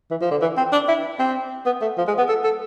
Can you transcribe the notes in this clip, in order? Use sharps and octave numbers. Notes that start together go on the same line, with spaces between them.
E3
F3
D3
E3
C4
D4
E4
C4
B3
A3
F3
G#3
B3
A4
A4